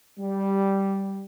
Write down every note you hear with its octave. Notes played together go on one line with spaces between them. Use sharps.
G3